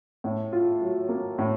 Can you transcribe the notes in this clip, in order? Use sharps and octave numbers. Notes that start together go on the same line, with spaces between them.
A2
F4
F#3
A#3
A2